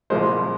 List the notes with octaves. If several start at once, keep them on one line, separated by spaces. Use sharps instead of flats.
C2 A#2 F3 G#3 C5